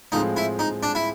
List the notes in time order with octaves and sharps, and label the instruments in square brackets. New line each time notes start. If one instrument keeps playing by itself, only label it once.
[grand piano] A2 F3 G#3 C4 [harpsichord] D#4
[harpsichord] E4
D#4
D4
E4